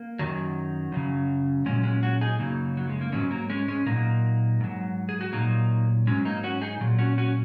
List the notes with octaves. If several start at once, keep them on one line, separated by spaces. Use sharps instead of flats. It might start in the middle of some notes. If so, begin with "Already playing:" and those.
Already playing: A#3
F#2 D#3 F#3
F#2 C#3 F#3
A#2 F#3 G#3 C#4
G#3 C#4
C#4 F#4
D#4 G#4
F#2 C#3 F#3 A#3 D#4
F#3
G#3
A#3
G#2 D#3 F#3 G#3 C#4
F#3 A#3
G#3 C#4
G#3 C#4
A#2 F#3 A#3 D#4
G#2 F#3
G#4
F#4
A#2 F#3 A#3 D#4
G#2 F#3 G#3 C#4
A#3 D#4
C#4 F#4
D#4 G#4
A#2 F#3
C#4 F#4
C#4 F#4